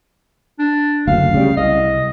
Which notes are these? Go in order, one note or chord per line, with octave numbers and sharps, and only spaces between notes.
D4
F#1 D2 F5
C#3 G3
C2 D#5